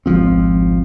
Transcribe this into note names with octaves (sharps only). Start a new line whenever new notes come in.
G#1 C#2 F3 C4